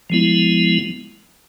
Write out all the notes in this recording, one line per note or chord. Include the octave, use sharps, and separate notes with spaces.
F3 G#3 B3 E4